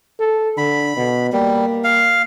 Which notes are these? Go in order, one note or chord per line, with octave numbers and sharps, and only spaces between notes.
A4
D3 B5
B2
G3 A#3
F5